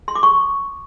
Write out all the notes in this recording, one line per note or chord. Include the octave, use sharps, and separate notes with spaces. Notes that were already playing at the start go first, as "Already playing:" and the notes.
C6
D6
C#6